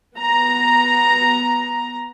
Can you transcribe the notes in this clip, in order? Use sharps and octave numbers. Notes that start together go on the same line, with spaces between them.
B3 A#5